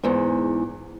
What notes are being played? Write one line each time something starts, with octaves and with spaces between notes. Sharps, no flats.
E2 G#2